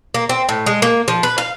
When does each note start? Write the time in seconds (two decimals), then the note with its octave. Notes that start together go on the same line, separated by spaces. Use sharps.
0.14 A#3
0.29 C4
0.49 A2
0.66 G#3
0.82 A#3
1.08 F3
1.23 B4
1.38 F5